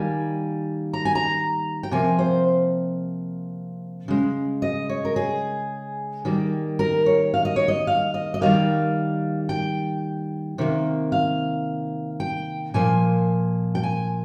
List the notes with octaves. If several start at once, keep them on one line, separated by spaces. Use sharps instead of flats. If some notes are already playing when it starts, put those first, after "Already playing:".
Already playing: D#3 G3 A#3 G#5
A#5
G#5
A#5
G5
C3 F3 A#3 G#5
C5
C#3 G#3
D#5
C#5
A#4
G#4
D#3 G3 A#3
A#4
C#5
F5
D#5
C#5
D#5
F5
D#5
D#5
D#3 G3 A#3 F5
G5
C3 D#3 A#3
F5
G5
A#2 F3 A#3 G#5
G5
G#5